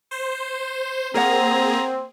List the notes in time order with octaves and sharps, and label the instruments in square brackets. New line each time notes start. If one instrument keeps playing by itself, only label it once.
[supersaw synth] C5
[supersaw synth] A#3 G#4 [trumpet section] C4 [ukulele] A#4 C#5 F#5 [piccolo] A#5